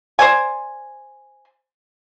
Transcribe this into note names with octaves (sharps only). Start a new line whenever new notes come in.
C5 D5 G#5